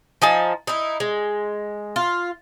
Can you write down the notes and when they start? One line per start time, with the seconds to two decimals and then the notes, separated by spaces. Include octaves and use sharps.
0.22 F3 D#4 G#5 A5
0.67 D#4 E4
1.00 G#3
1.96 F4